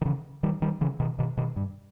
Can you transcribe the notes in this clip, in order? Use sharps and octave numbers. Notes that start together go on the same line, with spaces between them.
D#3
C#3 E3
D#3 G3
D#3 G3
C#3 E3
B2 D#3
B2 D#3
B2 D#3
G2